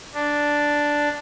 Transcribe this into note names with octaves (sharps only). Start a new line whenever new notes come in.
D4